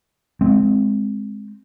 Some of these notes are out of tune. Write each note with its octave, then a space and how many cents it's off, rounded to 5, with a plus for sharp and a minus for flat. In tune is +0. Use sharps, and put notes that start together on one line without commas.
G#3 +5 C4 +0